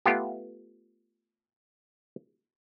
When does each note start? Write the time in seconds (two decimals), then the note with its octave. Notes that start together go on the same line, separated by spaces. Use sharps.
0.06 A3 B3 F4 G4